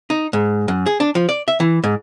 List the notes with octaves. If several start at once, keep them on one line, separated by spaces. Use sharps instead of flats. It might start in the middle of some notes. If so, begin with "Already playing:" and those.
D#4
G#2
F#2
G#4
D4
F3
D5
E5
E3
G#2